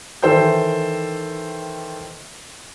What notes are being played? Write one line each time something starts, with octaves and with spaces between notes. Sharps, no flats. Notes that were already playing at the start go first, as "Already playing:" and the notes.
D#3 E3 A4 C5 G5 G6